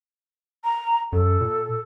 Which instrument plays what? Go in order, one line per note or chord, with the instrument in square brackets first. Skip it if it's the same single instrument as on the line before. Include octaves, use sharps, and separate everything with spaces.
[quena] A#5
[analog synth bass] F#2 [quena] A4
[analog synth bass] A#2